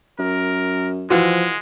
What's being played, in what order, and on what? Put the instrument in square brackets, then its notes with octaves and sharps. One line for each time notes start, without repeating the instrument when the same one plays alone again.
[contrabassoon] F#2 [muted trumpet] A#4
[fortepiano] E3 F4 F#4 [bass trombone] F3 [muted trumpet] G#3